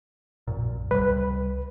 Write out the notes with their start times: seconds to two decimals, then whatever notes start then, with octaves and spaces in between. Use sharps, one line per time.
0.47 A#1 F#2 A#2
0.91 C#2 C3 G3 B4